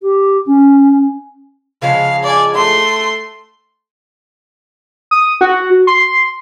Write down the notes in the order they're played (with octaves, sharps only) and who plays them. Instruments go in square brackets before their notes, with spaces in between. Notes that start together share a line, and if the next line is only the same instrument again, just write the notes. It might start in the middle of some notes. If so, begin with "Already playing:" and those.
[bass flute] G4
C#4
[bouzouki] C#3 F3 G#3 [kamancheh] F5
[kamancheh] D5 G#5
A3 C6
[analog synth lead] D#6
F#4
C6